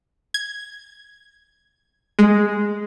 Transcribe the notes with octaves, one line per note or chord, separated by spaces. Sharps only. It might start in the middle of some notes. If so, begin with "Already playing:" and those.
G#6
G#3